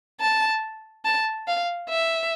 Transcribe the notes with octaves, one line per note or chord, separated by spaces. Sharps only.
A5
A5
F5
E5